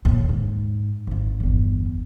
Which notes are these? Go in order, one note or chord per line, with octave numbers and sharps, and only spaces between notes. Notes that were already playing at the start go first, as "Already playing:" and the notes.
D#2 A#2
G#2
G#1 F4
G1 E2